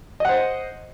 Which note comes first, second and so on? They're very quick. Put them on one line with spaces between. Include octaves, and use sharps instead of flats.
D#5 F#5 C5